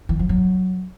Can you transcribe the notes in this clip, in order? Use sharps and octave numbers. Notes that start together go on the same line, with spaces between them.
E3
F3
F#3